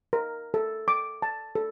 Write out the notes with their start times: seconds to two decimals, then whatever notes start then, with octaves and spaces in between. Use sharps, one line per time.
0.13 A#4
0.54 A4
0.88 D6
1.22 A5
1.55 A4